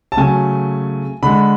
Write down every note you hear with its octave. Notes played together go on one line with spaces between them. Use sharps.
A5
C#3 F#3 A3 G#5
D3 G#3 B5